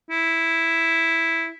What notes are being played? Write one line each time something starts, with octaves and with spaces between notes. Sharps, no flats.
E4